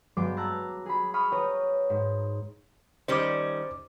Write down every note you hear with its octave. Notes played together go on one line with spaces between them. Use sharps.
G2 F#3 G#3 B3 G5 D6
A5 A#5 E6 F#6
G#4 B5
B5 C#6 D#6 F6
B4 C#5 G5 A#5 D#6
G#2
D#3 G3 C#4 C5 D6